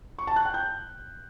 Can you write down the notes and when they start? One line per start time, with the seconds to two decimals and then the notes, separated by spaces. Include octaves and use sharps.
0.19 C#6
0.27 A5
0.36 F#6
0.45 G5
0.54 G6